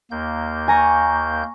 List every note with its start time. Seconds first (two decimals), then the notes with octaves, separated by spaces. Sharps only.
0.11 D#2 A#3 G6
0.68 G#5 A#5 C#6